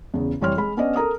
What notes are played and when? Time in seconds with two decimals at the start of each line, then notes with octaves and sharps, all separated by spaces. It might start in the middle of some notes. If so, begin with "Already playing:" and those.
0.14 E2 C#3
0.41 F1 E3 G3 C#5 C6 F6
0.57 G#3 B5
0.77 B3 C#4 D4 D5 D#5
0.96 A4 A#4 A#5 D#6